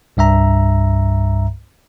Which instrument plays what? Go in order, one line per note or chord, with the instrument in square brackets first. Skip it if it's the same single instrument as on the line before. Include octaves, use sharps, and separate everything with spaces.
[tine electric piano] C2 G2 E5 A#5